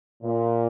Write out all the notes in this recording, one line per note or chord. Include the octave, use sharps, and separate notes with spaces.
A#2